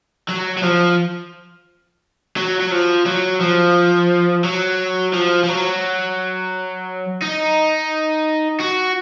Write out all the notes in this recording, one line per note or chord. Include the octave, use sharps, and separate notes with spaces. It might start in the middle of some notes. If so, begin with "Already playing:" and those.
F#3
F#3
F3
F#3
F#3
F3
F#3
F3
F#3
F3
F3
F#3
D#4
F#4